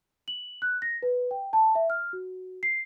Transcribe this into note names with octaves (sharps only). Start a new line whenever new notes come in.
F#7
F#6
A#6
B4
G5
A5
E5
F6
F#4
C7